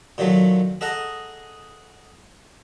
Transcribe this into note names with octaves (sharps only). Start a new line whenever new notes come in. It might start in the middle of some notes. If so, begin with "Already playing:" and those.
A#2 D#3 F#3 A3
G#4 A4 D#5 F#5 A#5